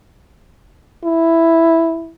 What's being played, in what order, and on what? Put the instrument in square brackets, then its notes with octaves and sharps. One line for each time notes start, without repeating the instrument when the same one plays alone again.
[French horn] E4